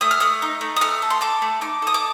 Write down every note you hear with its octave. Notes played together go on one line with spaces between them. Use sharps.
A3 D#6
F6
A3 D#6
D#4
A3
D#6
A3 F6
A4
C6
A4 D6
A3
D#4 D6
A4 D#6
D6